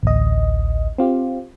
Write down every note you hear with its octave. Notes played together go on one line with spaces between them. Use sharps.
A1 D2 D#5
C4 F4 G4